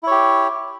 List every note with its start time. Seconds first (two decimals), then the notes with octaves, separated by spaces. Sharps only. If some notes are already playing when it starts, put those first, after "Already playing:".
0.03 E4
0.07 C#5
0.11 G4